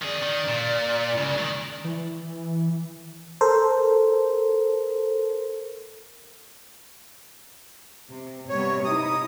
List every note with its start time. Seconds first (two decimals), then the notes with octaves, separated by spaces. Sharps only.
0.02 D#3 G#4 D5
0.23 D#3
0.48 A#2
1.18 C#3 G#3
1.38 D#3 F#3
1.84 E3
3.41 A4 A#4 C5
8.09 C3
8.49 C3 G3 B3 C#5
8.85 D#4 E4 D#6